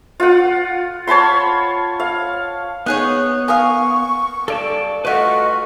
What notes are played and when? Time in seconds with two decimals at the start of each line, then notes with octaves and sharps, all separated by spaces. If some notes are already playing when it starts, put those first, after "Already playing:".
0.20 F4 F#5
1.07 C#5 A5 B5 C6
2.00 F5
2.86 B3 D#4 G#4 C#5 F#6
3.48 A#4 F5 G#5 C#6 D#6
4.48 G2 A4 D5 A5
5.05 G2 A3 F4 F#4 B4 D#5 C#6 F#6